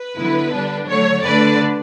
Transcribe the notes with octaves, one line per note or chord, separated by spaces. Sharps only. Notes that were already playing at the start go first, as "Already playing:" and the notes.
Already playing: B4
D3 F#3 B3 E4
D3 G3 D4
D3 F#3 A3 C#5
D3 A3 D4 B4 D5